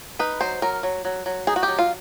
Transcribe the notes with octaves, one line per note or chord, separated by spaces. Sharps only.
D#4 B4
F#3 C5
F#3 A#4
F#3
F#3
F#3
D#4 G#4
F#4
G4
F#3
F4